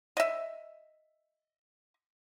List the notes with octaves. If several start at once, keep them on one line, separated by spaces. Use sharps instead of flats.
D#5 E5